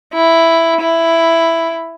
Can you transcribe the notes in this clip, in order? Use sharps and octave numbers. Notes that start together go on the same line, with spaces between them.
E4
E4